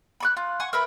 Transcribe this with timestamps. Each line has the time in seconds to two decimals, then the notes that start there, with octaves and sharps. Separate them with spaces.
0.20 B5 C#6 F#6
0.37 F4
0.60 F#5 G#5 C#6
0.73 A#4 B4 E5 B5